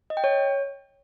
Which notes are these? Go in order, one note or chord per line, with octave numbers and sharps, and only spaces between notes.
D#5
G5
C#5